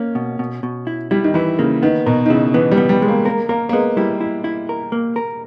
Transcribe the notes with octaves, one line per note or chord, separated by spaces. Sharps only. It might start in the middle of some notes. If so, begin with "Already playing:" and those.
Already playing: A#3 C#4
B2
B2
B2
E4
G3 E4
D#3
E3 E4
C#3 A#3
D#3 B3
B2 A#4
D#3
C#3 E4
E3 B3
G3
B3
G3
G#3
A#3
A#3 A#4
A#3 A#4
A#3
G#3 B3
G3 E4
E4
E4
A#4
A#3
A#4